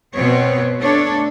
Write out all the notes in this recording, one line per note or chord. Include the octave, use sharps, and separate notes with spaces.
B2 B3 C4 C5 C#5
A3 D4 A4 C#5